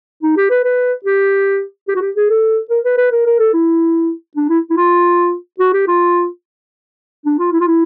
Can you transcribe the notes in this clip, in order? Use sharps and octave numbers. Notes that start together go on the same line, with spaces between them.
D#4
G4
B4
B4
G4
G4
F#4
G4
G#4
A4
A#4
B4
B4
A#4
A#4
A4
E4
D4
E4
E4
F4
F#4
G4
F4
D4
F4
E4
F4
E4